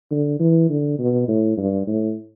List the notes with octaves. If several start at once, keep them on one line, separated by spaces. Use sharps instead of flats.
D3
E3
D3
B2
A2
G2
A2